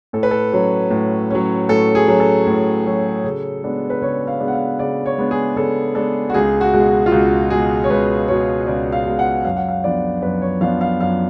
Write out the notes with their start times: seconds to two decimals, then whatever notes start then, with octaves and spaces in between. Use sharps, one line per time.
0.13 A2 A4
0.23 B4
0.31 A4
0.52 F#3 C#4
0.90 A2
1.30 F#3 C#4
1.69 A2 A4
1.95 G#4
2.07 F#3 C#4
2.20 A4
2.47 A2
2.85 F#3 C#4
3.24 C#3
3.63 G#3 B3 D4
3.90 B4
4.02 C#3 C#5
4.27 F5
4.40 G#3 B3 D4
4.48 F#5
4.53 F5
4.79 C#3 D5
5.06 C#5
5.18 G#3 B3 D4
5.31 G#4
5.56 C#3 A4
5.95 G#3 B3 D4 A4
6.30 F#4
6.34 C#2 G#4
6.61 F#4
6.73 B2 G#3
7.06 F4
7.12 C#2 F#4
7.50 B2 G#3 G#4
7.84 C#5
7.89 C#2 B4
8.28 B2 G#3 C#5
8.67 C#2 D5
8.92 F5
9.06 B2 G#3
9.19 F#5
9.45 F#2 F5
9.56 F#5
9.69 F5
9.84 F3 B3 D4 D5
10.22 F#2 B4
10.42 C#5
10.61 F3 B3 D4 F5
10.81 F5
11.00 F#2 F5